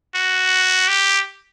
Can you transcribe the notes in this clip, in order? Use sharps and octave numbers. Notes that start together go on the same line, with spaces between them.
F#4
G4